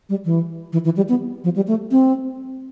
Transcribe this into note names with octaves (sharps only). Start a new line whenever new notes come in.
G3
E3
E3
E3
G3
B3
F3
G3
A3
C4